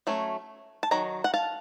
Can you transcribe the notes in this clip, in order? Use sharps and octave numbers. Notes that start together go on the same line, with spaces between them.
F#3 A3 C#4
A5
D#3 F#3 A#5
F#5
F5 A5